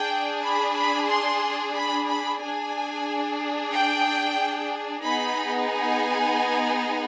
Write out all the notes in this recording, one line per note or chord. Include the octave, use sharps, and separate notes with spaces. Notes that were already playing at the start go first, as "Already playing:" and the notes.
Already playing: D4 G#4 G5
B5
B5
C6
B5
B5
D4 G#4 G#5
G5
B3 D#4 G#4 B5
G#5